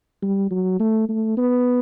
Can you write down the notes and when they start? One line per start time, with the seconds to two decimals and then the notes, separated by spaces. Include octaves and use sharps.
0.22 G3
0.51 F#3
0.80 A3
1.09 A3
1.37 B3